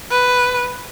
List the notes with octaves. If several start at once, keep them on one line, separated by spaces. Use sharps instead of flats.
B4